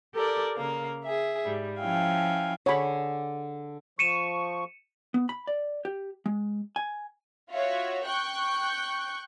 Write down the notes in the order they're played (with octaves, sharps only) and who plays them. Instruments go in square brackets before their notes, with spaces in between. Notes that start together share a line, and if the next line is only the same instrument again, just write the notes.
[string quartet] G4 A4 A#4 D5
C#3 A#3 F5
G#4 E5
G#2 G3
F3 C#4 E4 F5 G5 G#5
[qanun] D3 G#4 [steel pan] C#5 B5
[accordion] F3 C#6 [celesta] C#7 D#7 E7
[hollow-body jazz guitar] B3
B5
D5
G4
G#3
G#5
[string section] F4 F#4 C#5 E5
G5 C#6 F#6 G6